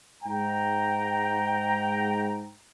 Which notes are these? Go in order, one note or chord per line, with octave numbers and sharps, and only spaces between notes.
G#2 G5 A#5